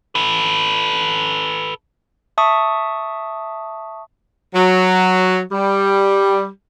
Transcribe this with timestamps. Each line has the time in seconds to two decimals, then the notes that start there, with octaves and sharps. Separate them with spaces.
0.15 A4 B4
2.38 E5 A5 C#6 D#6
4.55 F#3
5.52 G3